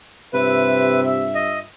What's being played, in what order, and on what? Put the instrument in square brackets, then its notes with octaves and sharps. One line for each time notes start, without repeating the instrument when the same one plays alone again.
[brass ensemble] G2 F4 E5 [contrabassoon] C3 [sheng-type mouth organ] B4
[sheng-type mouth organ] D#5